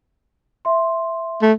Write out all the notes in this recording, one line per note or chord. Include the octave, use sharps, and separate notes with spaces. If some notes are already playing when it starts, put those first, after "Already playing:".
E5 C6
A3